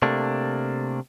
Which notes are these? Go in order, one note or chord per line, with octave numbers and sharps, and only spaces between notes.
C3 A3 A#3 D4